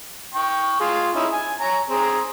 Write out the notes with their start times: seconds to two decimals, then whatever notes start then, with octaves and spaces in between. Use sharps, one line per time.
0.34 G5 C#6
0.80 F4 G#4
1.15 C#4 D#4 E4
1.32 G#5
1.60 C#5 A#5
1.89 C4 G#4 A#5